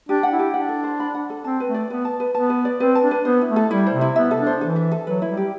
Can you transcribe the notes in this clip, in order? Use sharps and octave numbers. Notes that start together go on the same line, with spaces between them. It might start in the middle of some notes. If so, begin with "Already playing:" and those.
D4 G4
F#5
E4
G4
D4 F#5
A4
C5
B5
F#5
A4
C4 A5
B4
A3
D5
B3 B4
A5
B4
B3 A5
B4
D5
C4 B4
A5
D4
B4
B3 C5
E4
A3
A4
G3 E4
C5
C3
E4
B3 E5
A4
D4
C5
E3 A4
E5
A4
F#3 B4
E4
G3
G4